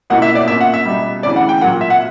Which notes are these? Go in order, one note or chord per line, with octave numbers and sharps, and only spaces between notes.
C#2 B2 A#3 E4 F#5
E5
D5
A#2 A#3 C#4 E5
F#5
E5
C#2 B2 G3
D2 C#3 E3 D5
F#5
G5
A#2 F#3 A#3 F#5
E5
F#5